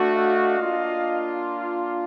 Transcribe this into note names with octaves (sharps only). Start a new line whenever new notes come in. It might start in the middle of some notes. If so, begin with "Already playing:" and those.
Already playing: A3 D4 F#4
D#5 F5
A#3 D4 F4